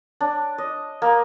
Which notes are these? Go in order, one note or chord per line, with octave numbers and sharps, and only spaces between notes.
D4
D#5
A#3